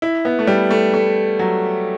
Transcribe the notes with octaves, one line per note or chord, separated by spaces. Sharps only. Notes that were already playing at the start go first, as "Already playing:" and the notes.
E4
B3
A3
G3
A3
A3
F#3